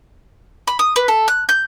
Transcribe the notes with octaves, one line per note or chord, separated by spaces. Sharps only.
B5
D#6
B4
A4
F#6
G6